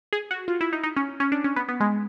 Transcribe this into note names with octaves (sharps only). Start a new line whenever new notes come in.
G#4
F#4
F4
E4
D#4
D#4
C#4
C#4
D4
C#4
B3
B3
G#3